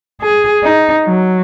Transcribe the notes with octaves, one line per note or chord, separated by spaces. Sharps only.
G#4
D#4
F#3